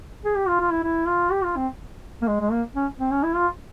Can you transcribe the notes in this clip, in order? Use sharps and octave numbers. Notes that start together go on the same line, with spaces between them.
G#4
G4
F4
F4
E4
E4
F4
G4
F4
C4
A#3
G#3
G#3
A#3
C#4
C4
C#4
E4
F4